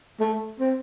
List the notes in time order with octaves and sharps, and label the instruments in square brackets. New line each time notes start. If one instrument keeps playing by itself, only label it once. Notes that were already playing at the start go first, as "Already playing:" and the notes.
[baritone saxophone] A3
C4